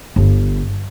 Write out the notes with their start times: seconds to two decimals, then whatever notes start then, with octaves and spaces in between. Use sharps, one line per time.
0.16 G1